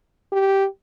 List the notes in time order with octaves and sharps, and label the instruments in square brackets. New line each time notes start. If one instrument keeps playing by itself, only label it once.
[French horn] G4